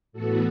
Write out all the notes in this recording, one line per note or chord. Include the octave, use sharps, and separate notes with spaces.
A2 E3 B3 F#4 A4